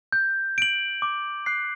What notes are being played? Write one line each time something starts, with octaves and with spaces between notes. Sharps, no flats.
G6
D7 F#7
D6
F#6 C7